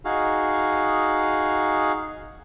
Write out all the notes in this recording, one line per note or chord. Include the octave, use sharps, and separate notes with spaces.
D#4 F#4 G#4 F5